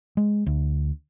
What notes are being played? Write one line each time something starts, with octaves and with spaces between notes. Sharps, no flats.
G#3
D2